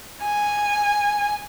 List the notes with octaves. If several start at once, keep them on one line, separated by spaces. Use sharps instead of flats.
G#5